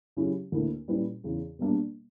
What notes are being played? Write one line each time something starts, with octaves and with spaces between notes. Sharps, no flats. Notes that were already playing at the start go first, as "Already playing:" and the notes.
C#3 F#3 C#4 E4 G4
D2 D3 A#3 E4 A#4
A#2 G3 C#4 E4 B4
E2 C#3 E3
B2 G3 A#3 D4